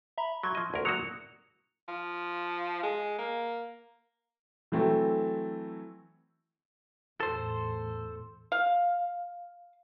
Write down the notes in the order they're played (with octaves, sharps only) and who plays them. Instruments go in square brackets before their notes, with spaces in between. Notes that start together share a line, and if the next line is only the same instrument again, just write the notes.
[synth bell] E5 A#5 B5
[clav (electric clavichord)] F#3 [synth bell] C6 C#6 G#6
[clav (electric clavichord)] F3 D#5
D2 A#4
[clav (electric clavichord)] F#3 A#3 F#4 [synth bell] D#6 C#7 F7
[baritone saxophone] F3
G#3
A#3
[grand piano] E3 F#3 A3 C4 A4
[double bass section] E2 A2 [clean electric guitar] A4 C5
[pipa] F5